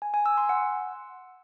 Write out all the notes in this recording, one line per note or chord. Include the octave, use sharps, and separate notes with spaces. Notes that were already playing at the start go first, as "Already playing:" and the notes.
G#5
G#5
E6
C6
F#5